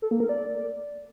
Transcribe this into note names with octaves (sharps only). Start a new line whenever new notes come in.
A4
A#3
A#4
D5